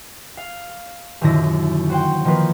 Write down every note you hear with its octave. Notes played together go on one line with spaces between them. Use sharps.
F5
D#1 F#2 D3 D#3 E4 A#6
F#4 C5 F#5 G5
D#3 F3 A#3 A#4 B4